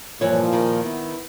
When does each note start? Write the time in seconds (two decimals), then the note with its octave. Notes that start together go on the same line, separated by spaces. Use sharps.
0.21 G2 A#2 E3 F3 C#5
0.53 D#3
0.82 B3 E4